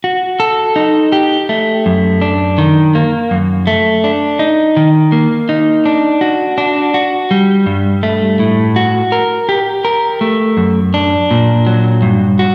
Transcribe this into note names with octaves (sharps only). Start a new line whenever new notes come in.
F#4
A4
D#4
G4
A3
F#2
D4
D#3
A#3
F#2
A3
D4
D#4
D#3
A#3
D#4
D4
F#4
D4
F#4
G3
G2
A3
A2
F#4
A#4
G4
A#4
A3
F#2
D4
A#2
F#3
G2
F#4